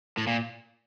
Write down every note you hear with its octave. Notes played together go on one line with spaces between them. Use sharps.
A2
A#2